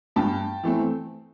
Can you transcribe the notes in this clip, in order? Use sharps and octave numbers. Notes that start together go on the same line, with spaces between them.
G2 G5 A5
E3 A3 C4